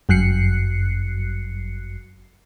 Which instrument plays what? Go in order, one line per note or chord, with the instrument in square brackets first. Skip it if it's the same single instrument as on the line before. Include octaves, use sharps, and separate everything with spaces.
[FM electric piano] G1 F#2 F#6 C7 C#7